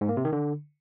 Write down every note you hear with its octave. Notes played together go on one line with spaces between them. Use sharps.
G#2
A#3
C3
D#3
D3